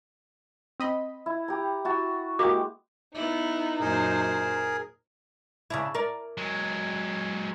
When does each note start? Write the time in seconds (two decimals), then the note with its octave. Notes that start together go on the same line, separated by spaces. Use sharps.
0.80 C4 D#5 B5
1.26 E4
1.48 G4 A#5
1.84 E4 F#4 A5
2.39 G#3 A#3 F#4 G4 D6 D#6
3.14 B3 D#4 E4
3.80 F#2 A#2 G#4 A#4 C5
5.70 C#3 D4 E4
5.95 A#4 D5
6.37 F#3 G#3